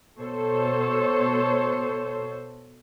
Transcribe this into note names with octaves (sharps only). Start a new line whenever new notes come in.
B2 A4 C5 C#5